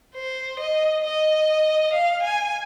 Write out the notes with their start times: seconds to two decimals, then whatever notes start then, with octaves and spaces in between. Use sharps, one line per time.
0.15 C5
0.59 D#5
1.04 D#5
1.93 F5
2.23 G#5